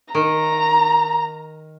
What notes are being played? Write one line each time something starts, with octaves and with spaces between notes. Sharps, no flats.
D#3 A#5